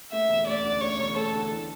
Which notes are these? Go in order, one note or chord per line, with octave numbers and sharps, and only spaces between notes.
A3 E5
E1
D2 D5
D3
A3 C#5
E1
D2 A4
D3
E3